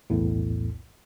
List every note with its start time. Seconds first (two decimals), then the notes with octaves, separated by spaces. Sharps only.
0.10 B1 E2 A2